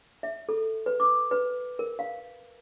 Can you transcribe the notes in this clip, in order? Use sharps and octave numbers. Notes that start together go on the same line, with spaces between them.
E5
A4
B4
D6
B4
A#4
F5